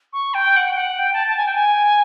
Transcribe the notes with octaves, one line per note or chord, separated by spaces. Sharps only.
C#6
G5
F#5
G5
F#5
G5
A5
A5
G#5
G5
G#5